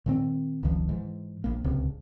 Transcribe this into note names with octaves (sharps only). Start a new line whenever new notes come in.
A#2 D#3 C4
F1 C#2 D#3 F3
G#2 E3
A#1 A#3
D1 C#2 C3